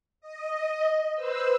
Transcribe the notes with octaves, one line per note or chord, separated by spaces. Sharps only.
D#5
B4 C5 E6